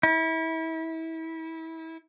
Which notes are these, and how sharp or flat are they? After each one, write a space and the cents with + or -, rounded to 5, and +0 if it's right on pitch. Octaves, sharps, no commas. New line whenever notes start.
E4 -30